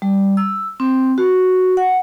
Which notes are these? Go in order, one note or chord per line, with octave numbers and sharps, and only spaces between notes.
G3
E6
C4
F#4
F#5